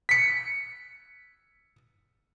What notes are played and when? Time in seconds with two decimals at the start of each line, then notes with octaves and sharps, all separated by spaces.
0.09 B6 C#7